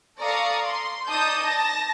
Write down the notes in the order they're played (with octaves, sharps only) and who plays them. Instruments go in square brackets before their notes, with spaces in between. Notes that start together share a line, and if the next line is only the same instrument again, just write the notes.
[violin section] A4 D5 F5 A#5 C#6 D#6
C6
D#4 D5 A5 D#6 G6
A5 A#6